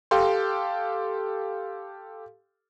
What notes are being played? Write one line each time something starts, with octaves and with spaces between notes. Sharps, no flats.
G4 A4 F5 G5 C6